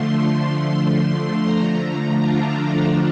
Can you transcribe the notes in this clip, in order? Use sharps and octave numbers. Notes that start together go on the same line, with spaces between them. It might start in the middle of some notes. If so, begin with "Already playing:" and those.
Already playing: D3 F3 A3 C6
A#5
D3 F3 A3 D4 F4